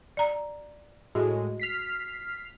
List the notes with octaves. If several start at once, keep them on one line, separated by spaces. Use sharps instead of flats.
D5 A#5
A2 G#3 F#4
F6 B6 C7